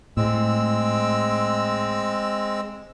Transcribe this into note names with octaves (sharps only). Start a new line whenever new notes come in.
A2 G#3 C4 E6